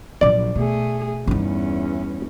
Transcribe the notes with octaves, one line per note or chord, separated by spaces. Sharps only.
A#1 F#3 D5
B2 A3 G#4
E2 G2 C#4 D#4